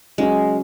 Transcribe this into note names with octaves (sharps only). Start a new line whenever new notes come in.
C#3 F#3 G#3 C#4 F#4